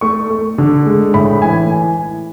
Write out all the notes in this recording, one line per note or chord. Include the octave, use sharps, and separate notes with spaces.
A3 C#6
A3
D3
G#3
A2 B5
E3 G#5